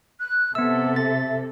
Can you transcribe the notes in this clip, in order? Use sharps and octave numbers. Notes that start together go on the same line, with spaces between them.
F#6
C3 B3 A4 E5 E6
A6